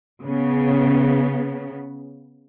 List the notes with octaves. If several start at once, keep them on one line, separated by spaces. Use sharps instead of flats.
C#3 B3